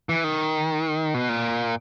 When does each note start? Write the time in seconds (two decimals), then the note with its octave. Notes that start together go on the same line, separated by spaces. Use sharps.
0.09 E3
0.24 D#3
1.14 B2
1.29 A#2